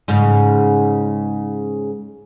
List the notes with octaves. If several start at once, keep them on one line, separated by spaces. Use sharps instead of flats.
G#2 C#3